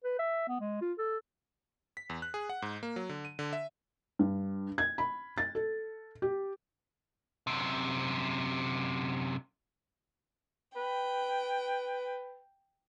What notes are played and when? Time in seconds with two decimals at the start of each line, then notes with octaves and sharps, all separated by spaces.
0.04 B4
0.19 E5
0.48 B3
0.60 G#3
0.81 F4
0.98 A4
1.97 B6
2.10 E2
2.22 F#6
2.34 G#4
2.49 F#5
2.62 G#2
2.83 A#3
2.96 F#3
3.09 D3
3.25 D#7
3.39 D3
3.53 E5
4.19 G2
4.78 G#6
4.98 B5
5.38 A6
5.55 A4
6.22 G4
7.47 F#2 C3
10.76 B4 G5